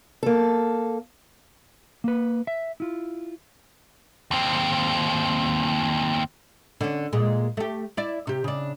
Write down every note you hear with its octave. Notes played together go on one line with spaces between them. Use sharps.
A#3 A4
A#3 B4
E5
E4 F4
D#2 C4
D3 C#4
A#2 G#3
A3 G4
E4 D5
C3 G4
C#3 D4